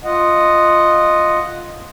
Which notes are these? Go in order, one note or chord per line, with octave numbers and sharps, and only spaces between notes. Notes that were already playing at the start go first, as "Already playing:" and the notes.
F4 D#5 F#5